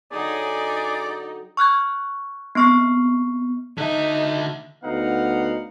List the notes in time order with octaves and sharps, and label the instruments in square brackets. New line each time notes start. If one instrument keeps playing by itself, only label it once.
[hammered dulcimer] D3 F#3 G5 [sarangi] D#4 [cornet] G#4 [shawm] D5
[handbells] C#6 F6 F#6 G#6
B3 C4 C#6 F6 C7
[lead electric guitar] D3 E5 [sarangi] D#4
[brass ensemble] D2 B3 D#4 F5 F#5